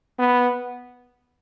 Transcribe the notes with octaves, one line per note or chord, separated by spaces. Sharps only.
B3